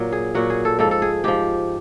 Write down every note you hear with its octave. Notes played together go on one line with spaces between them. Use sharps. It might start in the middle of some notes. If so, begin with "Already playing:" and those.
Already playing: A#2 F#3
G#4
A#2 F#3 F#4
G#4
A4
G#2 F3 A4
A4
G#4
G#2 F3 G4